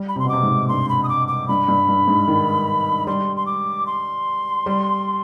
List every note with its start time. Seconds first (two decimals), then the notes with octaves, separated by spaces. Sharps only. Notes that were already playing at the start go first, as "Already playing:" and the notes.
Already playing: G3
0.09 B5
0.16 C3
0.19 B2 C6
0.29 C3 D6
0.43 G#2
0.68 G2 C6
0.89 B5
1.04 D#6
1.09 D6
1.28 D6
1.48 G2 B5
1.68 G2
1.89 G2
2.08 G#2
2.28 D#3
3.07 G3 C6
3.37 C6
3.46 D6
3.87 C6
4.66 G3